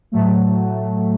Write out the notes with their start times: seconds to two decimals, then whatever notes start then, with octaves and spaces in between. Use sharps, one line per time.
0.12 A2 F#3 A3